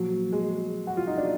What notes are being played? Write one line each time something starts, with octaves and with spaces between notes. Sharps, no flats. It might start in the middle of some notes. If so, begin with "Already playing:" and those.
Already playing: A#2 F3 F#3
G#3
F#4
F4
D#4
D4